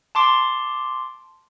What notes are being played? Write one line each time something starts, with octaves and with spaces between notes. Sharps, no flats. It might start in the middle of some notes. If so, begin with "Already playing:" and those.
A5 C6 D6